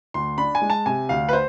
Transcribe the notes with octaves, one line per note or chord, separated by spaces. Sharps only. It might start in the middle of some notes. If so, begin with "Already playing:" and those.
D2 C6
D4 B5
G#5
G#3
A5
C3 G#5
D2 F5
B4
C5